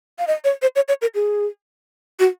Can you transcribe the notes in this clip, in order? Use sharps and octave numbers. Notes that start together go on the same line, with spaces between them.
F5
D#5
C#5
C5
C#5
C#5
A#4
G#4
F#4